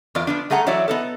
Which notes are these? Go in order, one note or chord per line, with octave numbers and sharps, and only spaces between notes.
E2 F4 D5
F3 B3 D4
G3 A3 G#4 F#5 A#5
E3 F#3 E4 C#5 D5 E5
B3 D#4 A4